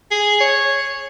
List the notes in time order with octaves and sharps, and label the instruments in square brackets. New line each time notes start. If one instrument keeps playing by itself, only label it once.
[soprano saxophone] G#4
C#5